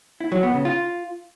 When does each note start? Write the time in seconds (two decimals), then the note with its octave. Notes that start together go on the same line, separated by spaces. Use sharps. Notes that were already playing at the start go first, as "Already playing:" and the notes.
0.20 E4
0.32 F#3
0.43 B3
0.54 C#3
0.65 F4